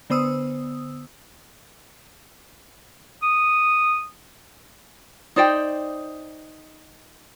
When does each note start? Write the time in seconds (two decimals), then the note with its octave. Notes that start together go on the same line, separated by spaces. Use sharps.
0.10 D3 B3 C5 D#6 E6
3.23 D#6
5.36 D#4 C5 D5 G5